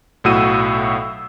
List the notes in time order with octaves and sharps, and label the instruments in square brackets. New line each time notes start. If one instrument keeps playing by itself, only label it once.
[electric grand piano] B1 A2 F#4 E6 D#7